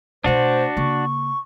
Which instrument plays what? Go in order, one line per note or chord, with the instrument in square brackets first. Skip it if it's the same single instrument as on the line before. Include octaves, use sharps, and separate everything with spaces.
[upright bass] B2 A3 [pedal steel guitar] D4 F#4 [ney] C5
[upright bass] C#3 A#3 [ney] C#6